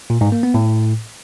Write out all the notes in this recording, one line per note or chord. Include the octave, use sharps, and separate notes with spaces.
A#2
G#2
A#3
B3
A2